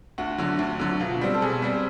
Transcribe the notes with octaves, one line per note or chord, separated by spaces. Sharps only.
D2 F#4
D3 F#3
D2
D3 F#3
B2 F4
G3 C4
A4
B2 G#4
G3 C4